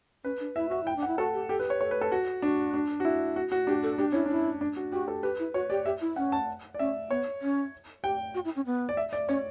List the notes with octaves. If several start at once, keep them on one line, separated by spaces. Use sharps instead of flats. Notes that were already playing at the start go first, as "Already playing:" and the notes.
C#4 B4
D4
E4 E5
F#4 E5
E4 G5
D4
F#5
E4
F#4 A4
G4
G4 A4
B4
C#5
A4 C#5
B4
A4
F#4
D4 F#4
D4
F#4
E4
F#4
F#4
D4 G4
A4
D4 G4
C#4 E4
D4 E4
D4
F#4
F#4 G4
A4
G4 B4
E4
F#4 C#5
G4 D5
G4 E5
E4
C#4 F#5
A5
D5
C#4 E5
B3 C#5
C#4
G4 G5
F#4
E4
C#4
B3
D5
E5
D5
C#4 C#5